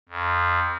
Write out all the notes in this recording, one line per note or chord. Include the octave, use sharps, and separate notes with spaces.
F2